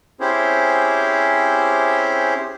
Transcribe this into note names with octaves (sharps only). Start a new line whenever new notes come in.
C4 C#4 E4 G4 G#4 C5